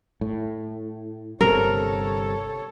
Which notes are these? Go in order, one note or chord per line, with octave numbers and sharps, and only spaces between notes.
A2
G1 C3 A4 A#4 C#5